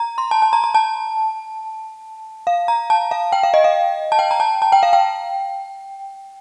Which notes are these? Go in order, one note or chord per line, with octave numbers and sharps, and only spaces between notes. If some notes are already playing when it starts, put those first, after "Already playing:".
Already playing: A#5
C6
A5
A5
A#5
A#5
A5
F5
A#5
A5
F5
G5
F5
D#5
F5
A5
G5
A#5
A5
A5
G5
F5
G5